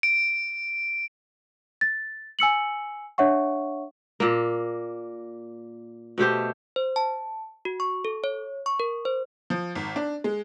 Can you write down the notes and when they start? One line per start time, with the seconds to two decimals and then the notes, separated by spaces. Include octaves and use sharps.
0.03 D7
1.81 A6
2.39 G#5 E6 C#7 F#7
3.18 D4 C#5 E5 F#5 C#6
4.20 A#2 A#3
6.18 B2 A3 G4 C5
6.76 C5
6.96 A5
7.65 F#4
7.80 C#6
8.05 A4
8.24 C#5
8.66 C#6
8.80 A#4
9.05 C5
9.50 F3
9.75 G#1
9.96 D4
10.24 G#3